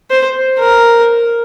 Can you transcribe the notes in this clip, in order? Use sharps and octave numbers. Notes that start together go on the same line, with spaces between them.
C5
A#4